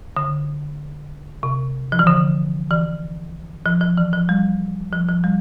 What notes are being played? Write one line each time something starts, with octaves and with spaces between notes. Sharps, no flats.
D3
C3
F3
E3
D3
E3
F3
F3
E3
F3
G3
F3
F3
G3